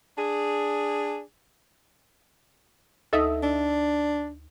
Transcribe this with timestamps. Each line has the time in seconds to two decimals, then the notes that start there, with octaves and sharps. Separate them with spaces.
0.17 D4 G#4
3.13 D2 D#4 A4 D#5 E5 D#6
3.43 D4